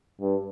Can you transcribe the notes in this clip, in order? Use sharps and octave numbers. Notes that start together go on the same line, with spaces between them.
G2